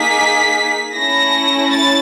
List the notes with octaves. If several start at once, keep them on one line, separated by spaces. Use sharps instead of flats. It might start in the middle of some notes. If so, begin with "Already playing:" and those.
Already playing: A#3 D#4 G#4 B6
A3 C#4 E4 A#6
A6